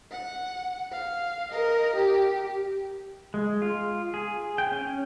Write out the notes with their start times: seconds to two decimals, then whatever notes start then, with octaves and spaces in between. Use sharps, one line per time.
0.11 F#5
0.92 F5
1.52 A#4 D#5
1.96 G4
3.34 G#3
3.62 F4
4.14 G#4
4.58 G5
4.72 C#4